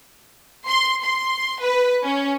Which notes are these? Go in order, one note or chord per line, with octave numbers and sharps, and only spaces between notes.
C6
C6
B4
C#4